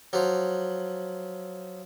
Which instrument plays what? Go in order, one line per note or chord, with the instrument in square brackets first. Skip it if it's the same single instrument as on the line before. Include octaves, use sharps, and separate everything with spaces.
[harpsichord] F3 F#3